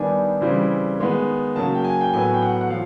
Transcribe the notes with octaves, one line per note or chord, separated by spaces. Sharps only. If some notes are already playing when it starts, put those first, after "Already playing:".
Already playing: D#3 G3 B3 D4 G#5
C#3 E3 G3 C4 E4
D#3 G#3 B3
C#3 F#3 A#3 A5
G5
G#5
G5
A2 F#3 B3 G#5
G5
F#5
F#5
F3 F5